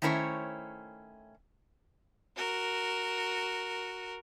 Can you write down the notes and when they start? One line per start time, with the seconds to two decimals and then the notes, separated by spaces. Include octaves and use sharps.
0.02 D#3 A3 C#4 E4 C5 C#5
2.36 F#4 A#4